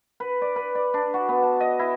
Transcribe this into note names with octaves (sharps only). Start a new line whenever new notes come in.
B4
D5
B4
D5
D4
F#4
B3
A5
D#5
E4